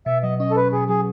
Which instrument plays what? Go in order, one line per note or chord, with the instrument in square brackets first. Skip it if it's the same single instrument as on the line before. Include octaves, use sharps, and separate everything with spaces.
[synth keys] B2 [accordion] E5
[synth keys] F#3 [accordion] D#5
[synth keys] C#4 [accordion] D#5
[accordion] A4
[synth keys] B2 [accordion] B4
[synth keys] B2 [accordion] G#4
[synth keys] F#3 [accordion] G#4